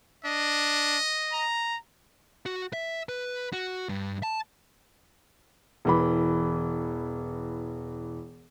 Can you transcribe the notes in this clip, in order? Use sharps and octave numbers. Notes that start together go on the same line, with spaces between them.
D4 D#5
A#5
F#4
E5
B4
F#4
G2
A5
E1 E3 B5